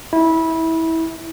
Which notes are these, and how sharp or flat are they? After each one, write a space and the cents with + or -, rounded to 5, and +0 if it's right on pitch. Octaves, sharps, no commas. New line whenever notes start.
E4 -20